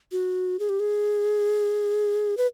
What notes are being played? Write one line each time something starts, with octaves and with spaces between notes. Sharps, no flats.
F#4
G#4
G4
G#4
B4